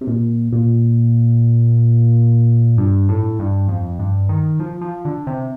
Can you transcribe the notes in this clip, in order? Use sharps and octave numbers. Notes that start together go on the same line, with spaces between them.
C3
A#2
A#2
G2
A2
G2
F2
G2
D#3
F3
F3
D3
C3